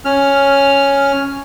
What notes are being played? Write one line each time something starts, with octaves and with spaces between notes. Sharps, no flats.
C#4 F6